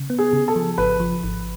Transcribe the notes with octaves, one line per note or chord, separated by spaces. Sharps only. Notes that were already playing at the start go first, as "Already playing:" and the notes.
Already playing: C#3
B3
G#4
C#3
A4
F3
G#1 B4
F3
G#1